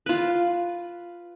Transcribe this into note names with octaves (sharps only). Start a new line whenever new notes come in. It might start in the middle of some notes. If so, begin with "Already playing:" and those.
F4 B4